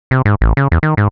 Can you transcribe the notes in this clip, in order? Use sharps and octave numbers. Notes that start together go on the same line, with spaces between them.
C3
G#2
A1
C#3
E2
D#3
G#2